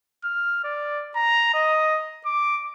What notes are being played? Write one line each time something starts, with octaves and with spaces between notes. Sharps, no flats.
F6
D5
A#5
D#5
D6